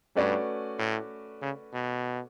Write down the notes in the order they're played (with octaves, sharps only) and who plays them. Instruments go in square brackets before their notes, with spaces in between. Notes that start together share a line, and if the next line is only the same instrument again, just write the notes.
[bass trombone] G2 [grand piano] A3 C#4 F#4 B4 D5
[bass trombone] A2
C#3
B2